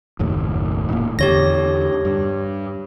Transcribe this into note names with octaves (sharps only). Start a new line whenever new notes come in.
F#1 D#2 A2
D#1 A2 A#3
E2 D3 G4 C#5 A#6
G2